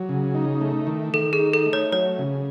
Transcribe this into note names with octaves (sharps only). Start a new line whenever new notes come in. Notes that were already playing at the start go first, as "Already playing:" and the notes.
Already playing: F#3
C#3
D#4
A3
D#3
D#3 A4
G#4
D#4
A4
A3
C#5
F#3 C#5
C#3